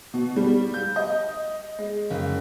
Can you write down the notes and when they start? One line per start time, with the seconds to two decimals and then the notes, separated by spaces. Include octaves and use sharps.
0.14 B2
0.36 G3
0.74 G6
0.96 D#5
1.78 G#3
2.10 F#1